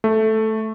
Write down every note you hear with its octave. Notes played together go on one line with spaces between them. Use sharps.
A3